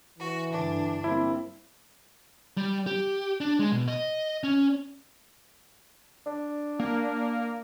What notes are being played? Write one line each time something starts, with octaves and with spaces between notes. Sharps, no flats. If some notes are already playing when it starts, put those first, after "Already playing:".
E3 F#4
G2 D3 D4
G3 A#3 C4 E4
G3
G4
D4
G#3
B2
D#5
C#4
D4
A#3